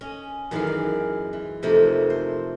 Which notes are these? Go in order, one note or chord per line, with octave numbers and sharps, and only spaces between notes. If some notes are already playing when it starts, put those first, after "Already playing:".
C#4 D#5
F#2 D#3 E3 G#3 A#4 F5
D5
E3
F2 C3 F3 A3 A#3 D#4
C5